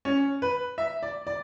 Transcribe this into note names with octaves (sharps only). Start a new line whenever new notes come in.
C#4
B4
E5
D5
D5